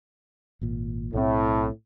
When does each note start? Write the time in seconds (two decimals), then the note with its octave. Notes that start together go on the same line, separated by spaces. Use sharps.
0.61 G#1 A#2
1.14 B1 A2 G3 C4